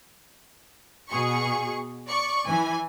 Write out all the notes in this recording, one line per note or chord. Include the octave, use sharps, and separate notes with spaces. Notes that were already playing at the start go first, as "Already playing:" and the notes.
B2 G#4 C#6
D5 C#6
E3 G#5